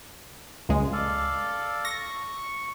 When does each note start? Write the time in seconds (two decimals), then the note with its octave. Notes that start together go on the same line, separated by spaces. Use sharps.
0.69 C#2 G#3
0.93 A4 D5 F5
1.85 C#6 A#6